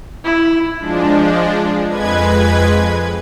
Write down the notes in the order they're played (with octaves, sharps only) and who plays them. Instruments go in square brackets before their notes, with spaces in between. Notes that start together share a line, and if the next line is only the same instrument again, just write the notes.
[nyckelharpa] E4
[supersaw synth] F3 G#3 D4
F2 G#3 B4 G#6